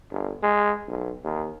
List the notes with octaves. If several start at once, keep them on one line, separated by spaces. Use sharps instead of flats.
G1
G#3
B1
D#2